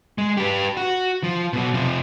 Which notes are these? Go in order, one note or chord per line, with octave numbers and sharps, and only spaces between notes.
G#3
G4 B4
F#4
F3
B2 F#3
C3 F3